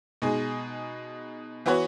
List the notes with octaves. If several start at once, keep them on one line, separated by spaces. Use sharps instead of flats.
B2 G#3 D#4 G#4
E3 B3 F#4 C#5